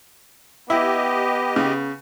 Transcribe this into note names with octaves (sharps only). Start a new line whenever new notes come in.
B3 E4 G4 D#5
C#3